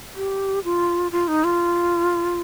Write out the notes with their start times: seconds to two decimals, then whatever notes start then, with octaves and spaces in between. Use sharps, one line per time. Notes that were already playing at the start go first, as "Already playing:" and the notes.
0.16 G4
0.64 F4
1.12 F4
1.28 D#4
1.44 F4